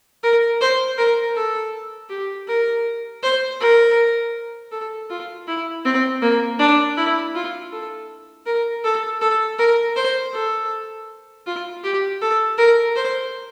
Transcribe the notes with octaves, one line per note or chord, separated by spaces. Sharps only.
A#4
C5
A#4
A4
G4
A#4
C5
A#4
A4
F4
E4
C4
A#3
D4
E4
F4
A4
A#4
A4
A4
A#4
C5
A4
F4
G4
A4
A#4
C5